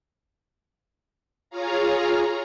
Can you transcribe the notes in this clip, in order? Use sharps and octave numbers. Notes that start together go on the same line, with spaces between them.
F4 G#4 C#5 F5 A#5